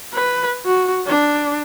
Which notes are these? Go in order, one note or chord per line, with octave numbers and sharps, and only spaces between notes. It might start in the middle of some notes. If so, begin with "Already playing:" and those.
B4
F#4
D4